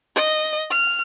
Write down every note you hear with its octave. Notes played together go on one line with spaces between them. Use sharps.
D#5
F6